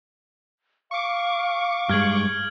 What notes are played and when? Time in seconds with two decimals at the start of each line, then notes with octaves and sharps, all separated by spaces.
0.91 F5 C#6 D6
1.89 G2 G#3 F6 G#6 F#7